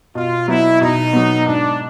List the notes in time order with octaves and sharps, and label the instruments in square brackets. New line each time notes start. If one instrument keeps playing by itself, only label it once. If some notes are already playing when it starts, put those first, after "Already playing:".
[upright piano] B2 [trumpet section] F4
[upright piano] F#3 B3 [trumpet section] E4
[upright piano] B2 [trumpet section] D#4
[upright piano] F#3 B3
[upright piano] G#2 [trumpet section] D4